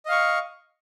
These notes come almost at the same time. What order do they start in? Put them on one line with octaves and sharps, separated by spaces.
D#5 F5 C#6